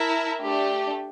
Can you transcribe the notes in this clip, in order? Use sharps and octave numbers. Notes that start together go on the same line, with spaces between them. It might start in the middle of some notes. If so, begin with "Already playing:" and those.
Already playing: E4 A#4 E5 A5
A3 D4 G4